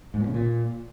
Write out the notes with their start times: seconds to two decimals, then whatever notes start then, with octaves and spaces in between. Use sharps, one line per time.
0.14 G#2
0.21 A#2
0.27 C#3
0.34 A#2